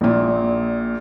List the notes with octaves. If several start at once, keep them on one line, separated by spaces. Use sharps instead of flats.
A#1 A#2